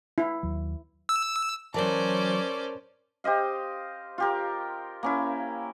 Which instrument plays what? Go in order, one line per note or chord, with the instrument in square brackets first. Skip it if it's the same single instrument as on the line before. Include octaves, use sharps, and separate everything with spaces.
[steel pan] E4
[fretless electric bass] D#2 F#3
[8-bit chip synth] E6
[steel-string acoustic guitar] E3 F#3 [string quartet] C#4 C5 D5 [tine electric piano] A#4 A5
[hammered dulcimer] G4 C5 D#5 F5
F4 G4 A#4
A#3 C#4 E4